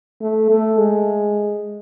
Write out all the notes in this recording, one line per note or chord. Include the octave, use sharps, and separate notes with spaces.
A3
A3
G#3